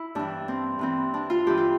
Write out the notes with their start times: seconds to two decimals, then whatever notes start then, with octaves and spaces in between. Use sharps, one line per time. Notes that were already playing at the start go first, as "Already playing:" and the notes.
Already playing: E4
0.15 G2 E3 D4
0.48 C4
0.79 G2 E3 C4
1.14 D4
1.30 F4
1.47 G2 E3 G4
1.57 F4